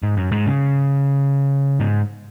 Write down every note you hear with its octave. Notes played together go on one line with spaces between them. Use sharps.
G#2
F#2
G#2
C#3
G#2